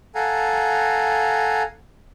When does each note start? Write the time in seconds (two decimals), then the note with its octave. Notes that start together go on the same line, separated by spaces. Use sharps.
0.15 A4 F5 F#5 G#5 A#5